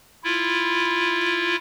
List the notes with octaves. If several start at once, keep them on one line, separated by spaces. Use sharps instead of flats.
E4 F4